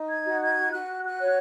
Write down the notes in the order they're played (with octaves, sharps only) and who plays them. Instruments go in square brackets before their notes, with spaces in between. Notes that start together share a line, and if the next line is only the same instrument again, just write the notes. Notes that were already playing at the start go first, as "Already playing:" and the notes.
Already playing: [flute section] D#4
G#6
F#4
G#6
F#4 F#6
F#6
C#5